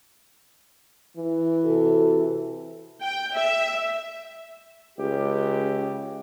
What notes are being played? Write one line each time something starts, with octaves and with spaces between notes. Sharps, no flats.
E3
C3 F#4 A4
G5
E5
C#2 G4